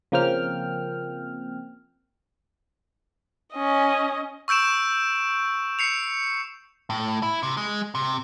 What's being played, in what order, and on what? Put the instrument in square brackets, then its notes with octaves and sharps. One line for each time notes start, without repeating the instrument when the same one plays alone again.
[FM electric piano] C#3 F3 A#3 C4 G5 F6
[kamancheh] C#4 D#5
[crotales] C#6 E6 G6 D7 E7
C7 C#7 F7
[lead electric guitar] A2
E4
C3
G#3
C3